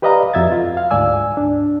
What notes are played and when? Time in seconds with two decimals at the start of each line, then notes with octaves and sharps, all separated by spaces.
0.02 G4 B4 D5 D#5 F5 A#5
0.34 F2 F#4 E5 G#6 A6
0.52 F4
0.77 F5
0.91 D2 G#2 D5 G#5 E6
1.37 D4